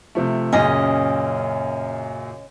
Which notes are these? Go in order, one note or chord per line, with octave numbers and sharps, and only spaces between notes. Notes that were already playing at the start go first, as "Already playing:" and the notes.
C3 F3 A3
F#2 A#2 C#3 C#4 D#5